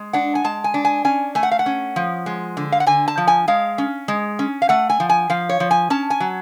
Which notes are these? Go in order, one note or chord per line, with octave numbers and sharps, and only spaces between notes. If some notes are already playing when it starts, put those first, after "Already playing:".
Already playing: G#3
D4 F#5
G#5
G#3 A5
G#5
D4
G#5
C#4 G#5
A3 G#5
F#5
F5
F#5
C#4
F3
G#3
D3
F5
F#5
D3 G#5
A5
F3
G#5
G#3 F5
C#4
G#3
C#4
F5
A3 F#5
G#5
F3
G#5
F3 F5
C#5
F3
G#5
C#4 A5
G#5
F#3